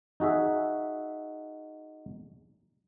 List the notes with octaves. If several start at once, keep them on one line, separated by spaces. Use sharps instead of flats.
D#4 F#4 G#4 E5